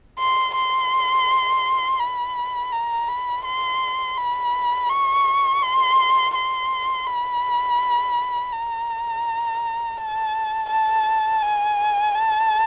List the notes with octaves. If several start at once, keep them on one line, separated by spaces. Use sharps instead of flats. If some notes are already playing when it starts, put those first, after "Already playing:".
C6
C6
B5
A#5
B5
C6
B5
C#6
C6
C6
B5
A#5
A5
A5
G#5
A5